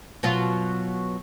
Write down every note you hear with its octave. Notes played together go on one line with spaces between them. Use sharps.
B2 F#3 F4